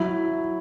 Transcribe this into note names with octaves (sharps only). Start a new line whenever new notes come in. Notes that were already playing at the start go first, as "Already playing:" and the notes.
Already playing: F#3 E4